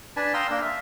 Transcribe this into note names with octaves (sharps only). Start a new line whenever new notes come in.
D4 B4 G#5 A5
F5 G5 A#5 C6 D#6 E6
A#3 D4 A#4
E5